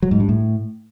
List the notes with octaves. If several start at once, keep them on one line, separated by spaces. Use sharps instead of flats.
F#3
G#2
G2
A2